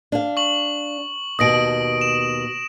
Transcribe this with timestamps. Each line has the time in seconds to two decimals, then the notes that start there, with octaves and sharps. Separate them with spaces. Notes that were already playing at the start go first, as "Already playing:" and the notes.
0.12 D4 F5
0.37 C#6 F#7
1.39 D#2 B2 A5 D#6 A#6 D7
2.01 E7